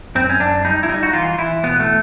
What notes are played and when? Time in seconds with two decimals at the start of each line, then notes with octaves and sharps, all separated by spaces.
0.15 F#2 C4
0.30 C#4
0.39 F#2 D4
0.64 G3 D#4
0.83 E4
0.89 G3 D#4
1.03 F#4
1.13 E3 F4
1.38 E3 E4
1.63 B2 B3
1.80 A3